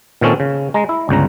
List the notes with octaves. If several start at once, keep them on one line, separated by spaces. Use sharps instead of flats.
A#2 D#3 C4 C#4 A4
C#3
G#3 A#5
E4
G1 C#2 C#3 A#5